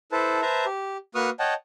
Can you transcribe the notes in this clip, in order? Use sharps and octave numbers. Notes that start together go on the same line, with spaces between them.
E4 A4 B4 C5 A5
B4 C5 E5 A5 A#5
G4
A#3 F#4 B4 C#6 D#6 F6
C#5 D#5 F#5 G5 A5